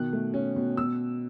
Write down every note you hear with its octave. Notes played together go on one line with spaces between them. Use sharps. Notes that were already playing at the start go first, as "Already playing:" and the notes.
Already playing: B2 D#3 F#6
A3
C#4
B2
B2 E6